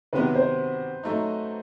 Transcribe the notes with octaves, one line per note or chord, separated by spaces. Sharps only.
C3 D#3 F#3 B3 B4
C5
F#3 A3 D#4